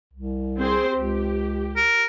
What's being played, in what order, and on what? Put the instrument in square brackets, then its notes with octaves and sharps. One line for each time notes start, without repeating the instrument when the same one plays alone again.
[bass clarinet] C2
[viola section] C4 G#4 C5
[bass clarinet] C#2 [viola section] G4
[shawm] A#4